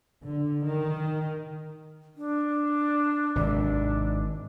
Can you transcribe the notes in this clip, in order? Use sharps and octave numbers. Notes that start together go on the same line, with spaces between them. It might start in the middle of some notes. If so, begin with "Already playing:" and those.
D3
D#3
D4
G#1 C3 D4